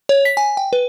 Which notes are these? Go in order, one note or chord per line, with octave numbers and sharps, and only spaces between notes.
C#5
B6
G#5
G5
B4